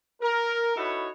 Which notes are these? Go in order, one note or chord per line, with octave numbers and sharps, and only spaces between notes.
A#4
D#4 E4 F#4 A4 B4 C#5